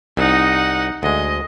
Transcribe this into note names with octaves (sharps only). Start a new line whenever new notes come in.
C2 D#4 F#5
D2 G#3 D#5